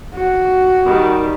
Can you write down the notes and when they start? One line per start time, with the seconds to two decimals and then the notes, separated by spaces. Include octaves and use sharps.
0.14 F#4
0.85 D#3 G3